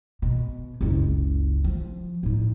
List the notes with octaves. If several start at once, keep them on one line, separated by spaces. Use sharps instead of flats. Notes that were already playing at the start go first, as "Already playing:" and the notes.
B2
F#1 C#2
F3
A2 D#4